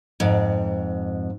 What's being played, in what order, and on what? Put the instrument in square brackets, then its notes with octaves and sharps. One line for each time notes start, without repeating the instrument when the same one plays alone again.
[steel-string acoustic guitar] F2 G#2